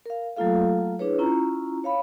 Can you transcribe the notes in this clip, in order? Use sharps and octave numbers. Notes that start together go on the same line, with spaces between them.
A#4 F5
F#3 A3 A#3 F4 A4 F5
D4 E4 G#4 B4 C#5
C#4 E4 F4 A#5
C#5 F5 B5